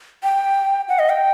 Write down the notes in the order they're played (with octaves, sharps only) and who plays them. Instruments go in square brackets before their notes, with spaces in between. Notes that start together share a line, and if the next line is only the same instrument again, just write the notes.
[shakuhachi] G5
F#5
D#5
G5